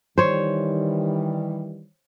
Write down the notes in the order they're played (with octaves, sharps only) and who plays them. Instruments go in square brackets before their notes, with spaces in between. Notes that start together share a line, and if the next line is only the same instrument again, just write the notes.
[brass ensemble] D#3 E3 G3 [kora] C5 C#5